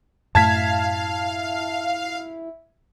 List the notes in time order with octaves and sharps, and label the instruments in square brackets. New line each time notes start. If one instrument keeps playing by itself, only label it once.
[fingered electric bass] F#2 A2 A3 [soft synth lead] E4 [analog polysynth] F5 [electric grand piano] A5 G#6 B6